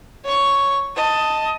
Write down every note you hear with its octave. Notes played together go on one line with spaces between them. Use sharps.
C#5 C#6
D#5 A5